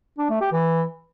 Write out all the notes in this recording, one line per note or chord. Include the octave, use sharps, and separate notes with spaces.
D4
A3
G4
E3